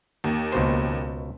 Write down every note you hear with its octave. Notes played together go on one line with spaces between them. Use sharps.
D#2
C#2 B2 C5